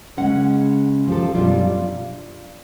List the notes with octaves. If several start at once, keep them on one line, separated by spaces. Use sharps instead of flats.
C#3 G#3 C#4 F#5
F3 G4 A4
F#2 B2 G3 D4 F4
F5